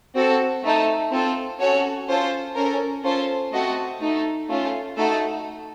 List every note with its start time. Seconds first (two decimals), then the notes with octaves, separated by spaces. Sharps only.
0.15 C4 F#4 A4
0.63 A3 D#4 A4
1.11 C4 F4 A4
1.60 C#4 F#4 A4 C#5
2.08 C#4 F4 A4 C5
2.55 C#4 A4 A#4
3.04 C#4 F4 A4 C5
3.52 A3 C4 F#4 A4 D#5
4.01 A3 D#4 A4
4.49 A3 C#4 F4
4.97 A3 D#4 F#4 A4